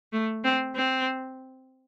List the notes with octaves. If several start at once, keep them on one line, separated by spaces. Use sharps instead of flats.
A3
C4
C4